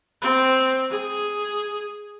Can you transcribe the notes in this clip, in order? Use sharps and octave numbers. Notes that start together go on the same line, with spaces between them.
C4
G#4